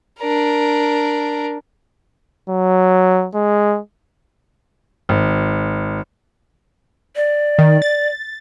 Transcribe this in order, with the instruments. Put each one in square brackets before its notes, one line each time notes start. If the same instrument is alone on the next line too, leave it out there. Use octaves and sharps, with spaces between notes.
[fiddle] D4 A#4
[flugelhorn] F#3
G#3
[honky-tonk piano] G#1
[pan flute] D5
[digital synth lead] D#3
A6